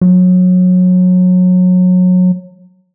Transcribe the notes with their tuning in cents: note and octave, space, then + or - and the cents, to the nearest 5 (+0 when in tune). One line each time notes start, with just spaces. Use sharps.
F#3 -25